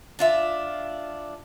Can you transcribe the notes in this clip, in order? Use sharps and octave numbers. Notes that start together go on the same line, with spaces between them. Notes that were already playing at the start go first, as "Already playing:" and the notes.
D4 F4 E5